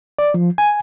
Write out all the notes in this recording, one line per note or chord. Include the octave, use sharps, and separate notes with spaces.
D5
F3
G#5